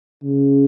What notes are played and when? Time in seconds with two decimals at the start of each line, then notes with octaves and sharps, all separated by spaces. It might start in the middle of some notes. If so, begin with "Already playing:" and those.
0.24 C#3